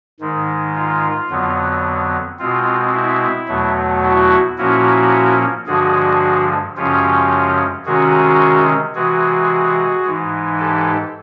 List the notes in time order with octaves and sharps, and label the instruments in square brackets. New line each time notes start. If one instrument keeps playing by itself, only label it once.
[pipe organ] G#2 D#3 G#3
F4
F2 D3 F#3 B3
B2 G#3 C4 F4
E4
E2 B2 F#3 A3
E4 F#4
A#2 F3 A#3 C#4 E4 F#4
G2 D3 F3 G#3 F#4 G#4
F#2 C#3 F3 G#3 C#4 F4 G4
C3 D#3 G#3 C#4 F#4 G#4
C3 E3 G#3 F#4 G#4
G#2 E3 G#3
G4 A4